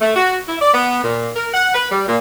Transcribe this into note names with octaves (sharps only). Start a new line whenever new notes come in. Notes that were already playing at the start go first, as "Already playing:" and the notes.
A3
F#4
E4
D5
B3
A#2
A#4
F#5
B4
G3
A#2